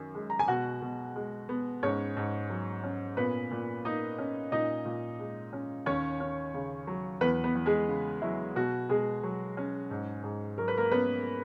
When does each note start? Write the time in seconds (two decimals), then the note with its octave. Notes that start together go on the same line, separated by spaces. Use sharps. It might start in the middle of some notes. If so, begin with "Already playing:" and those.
Already playing: F#2 D#3 C#4
0.15 G#3
0.30 A#5
0.39 G#5
0.48 B2 F#4 F#5
0.82 B2
1.16 G#3
1.49 B3
1.83 G#2 C#4 C#5
2.17 G#2
2.50 F#3
2.84 C#4
3.17 A#2 B3 B4
3.51 A#2
3.85 A#3 D#4 D#5
4.18 C#4
4.52 A#2 D#4 D#5
4.85 A#2
5.19 G#3
5.53 C#4
5.86 D#2 C#4 C#5
6.20 C#4
6.54 C#3
6.87 F#3
7.21 E2 B3 B4
7.44 B3 B4
7.55 E2
7.66 G#3 G#4
7.89 C#3
8.22 F#3 E4
8.56 B2 F#4
8.89 B2 G#3 G#4
9.23 F#3
9.57 C#4
9.91 G#2
10.24 G#2
10.58 F#3 A#4
10.68 B4
10.78 A#3 A#4
10.91 B3 C#4 B4